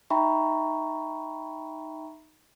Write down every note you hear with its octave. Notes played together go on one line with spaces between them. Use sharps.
D#4 E5 G5 A#5 B5 C#6